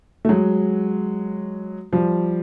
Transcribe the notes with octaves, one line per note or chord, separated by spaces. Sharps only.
A3
F#3 G#3
F3 G3